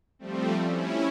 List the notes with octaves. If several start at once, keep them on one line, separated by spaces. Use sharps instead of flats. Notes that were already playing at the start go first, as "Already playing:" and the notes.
F3 G3 A3 C4
C#4 E4